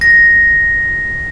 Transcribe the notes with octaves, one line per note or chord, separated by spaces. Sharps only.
A#6